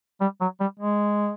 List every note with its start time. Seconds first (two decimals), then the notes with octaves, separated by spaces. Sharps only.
0.21 G3
0.41 F#3
0.60 G3
0.80 G#3